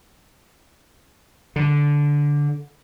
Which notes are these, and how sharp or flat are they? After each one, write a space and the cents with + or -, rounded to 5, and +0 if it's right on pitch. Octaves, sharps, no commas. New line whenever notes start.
D3 -10